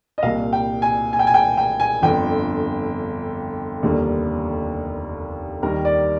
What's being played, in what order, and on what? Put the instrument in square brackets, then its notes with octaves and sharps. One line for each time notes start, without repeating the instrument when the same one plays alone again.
[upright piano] D#5
C2 A#2 G3 A#3 F5
G5
G#5
G#5
G5
G#5
G5
G5
G#5
G1 F2 D3 G5
F1 D#2 D3 G3 A#3
D#2 D#3 G3 A#3 A#4
D5